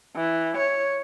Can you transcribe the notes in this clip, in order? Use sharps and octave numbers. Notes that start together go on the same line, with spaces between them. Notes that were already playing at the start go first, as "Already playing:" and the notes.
E3
C#5